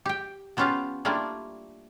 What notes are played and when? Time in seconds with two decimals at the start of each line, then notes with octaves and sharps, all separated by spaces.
0.06 G4 G5
0.57 F3 B3 C#4 F4 G4 F5
1.05 G3 A3 A#3 D4 E4 F4